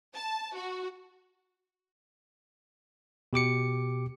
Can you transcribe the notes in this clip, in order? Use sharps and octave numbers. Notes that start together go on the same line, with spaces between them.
A5
F#4
B2 G4 D6 C#7